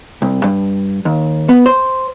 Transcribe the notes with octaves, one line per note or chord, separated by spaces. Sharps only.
C2
G2
D#2
B3
C5